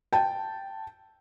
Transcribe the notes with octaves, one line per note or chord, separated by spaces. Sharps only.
G5 A5